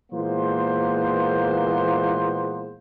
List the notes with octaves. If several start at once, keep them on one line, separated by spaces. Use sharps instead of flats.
A#2 E3 G#3 A#3 B3 C5